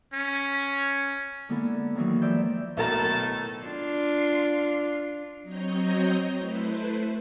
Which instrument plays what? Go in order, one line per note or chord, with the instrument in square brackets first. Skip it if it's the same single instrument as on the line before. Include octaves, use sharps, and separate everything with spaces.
[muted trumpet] C#4
[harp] D3 G#3 A#3 B3 E4 A4
D#3 E3 F#3 A#3 D#4
F3 G#3 D5 E5 G6
[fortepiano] B1 A#4 A#5 [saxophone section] A2 D#3 A4 [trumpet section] A5
[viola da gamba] D4 F4
[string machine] F#3 C4 C#5 D#5 A#5 G6
A3 E4 B4 C5